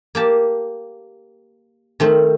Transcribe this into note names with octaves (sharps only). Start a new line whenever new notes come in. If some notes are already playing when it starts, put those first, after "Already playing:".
A#3 G4 A5
D#3 A3 C4